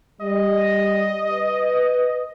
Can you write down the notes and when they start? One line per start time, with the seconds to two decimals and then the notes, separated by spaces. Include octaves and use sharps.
0.21 G3 D#5
1.30 B4